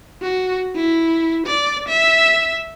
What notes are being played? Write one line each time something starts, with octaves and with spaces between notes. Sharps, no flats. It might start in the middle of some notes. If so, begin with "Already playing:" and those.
F#4
E4
D5
E5